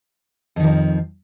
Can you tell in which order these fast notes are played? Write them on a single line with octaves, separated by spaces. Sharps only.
F2 D#3 F3